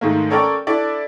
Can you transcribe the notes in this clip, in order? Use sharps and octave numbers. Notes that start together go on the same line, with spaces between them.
G#2 D#3 A3 A#3
C#4 A4 A#4 C#5 D5 G5
D4 E4 A4 D5